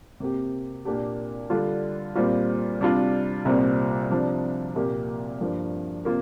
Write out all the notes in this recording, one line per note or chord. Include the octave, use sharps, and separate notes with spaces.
C3 A#3 G4
A#2 A#3 D4 G4
D3 G3 D4 F4
A#2 G3 C4 F4
C3 G3 D4 F4
C2 A#2 G3 C4
C3 F3 D4
C2 A#2 A#3 G4
G2 F3 A#3
C3 A#3 F4